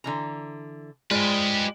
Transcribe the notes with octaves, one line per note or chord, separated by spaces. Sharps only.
D3 E3 A#5
G#3 F4 G4 B4 C5 D5